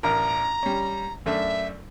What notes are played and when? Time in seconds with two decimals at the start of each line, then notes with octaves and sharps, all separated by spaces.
0.03 A1 D4 A#4 A#5
0.63 G3 C#4
1.26 F#2 A3 D4 E5